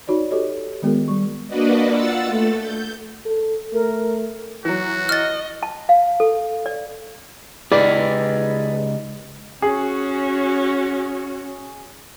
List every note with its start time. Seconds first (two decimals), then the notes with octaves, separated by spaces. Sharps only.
0.07 D#4 F#4 C#5 D5
0.31 F#4 G4 A4 C#5 D#5
0.82 D#3 G#3 B3 F#4 G#4 A#4
1.08 G3 C#6
1.47 A#3 D4 F#4 B4 D5 D#5
1.88 F4 F#5 E6 A6
2.25 A3 A4
2.60 G6
3.25 A4
3.73 A3 A#4
4.65 E3 F#3 F#4
5.09 D#5 F6 A6
5.63 A5
5.89 F5
6.20 A4
6.66 D5
7.72 C#2 D#4 G4 G#4 B4 D5
9.62 C#4 F#4 G#4